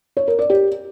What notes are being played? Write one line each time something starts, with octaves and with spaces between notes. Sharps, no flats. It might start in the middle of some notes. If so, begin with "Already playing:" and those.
C#5
A#4
D5
G4